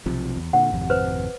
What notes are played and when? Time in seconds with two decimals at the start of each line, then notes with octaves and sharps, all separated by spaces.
0.06 B1 C3 F3
0.37 E2
0.53 A#2 D3 F#5
0.72 G#1 F2 C3
0.90 B4 C5